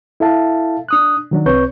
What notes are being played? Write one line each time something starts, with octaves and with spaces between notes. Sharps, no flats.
E4 A4 E5 F5 A5
D4 D#6 F#6
D#3 F#3 D4
C2 C4 B4 C#5 C#6 G6